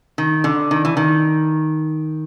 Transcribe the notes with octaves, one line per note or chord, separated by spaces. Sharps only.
D#3
D3
D#3
E3
D#3